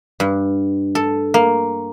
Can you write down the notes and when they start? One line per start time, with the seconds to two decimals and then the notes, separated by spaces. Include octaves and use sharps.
0.20 G2
0.95 A4
1.34 A#3